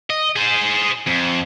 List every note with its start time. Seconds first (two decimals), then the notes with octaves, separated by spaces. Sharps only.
0.10 D#5
0.36 G#4 C5
1.07 F2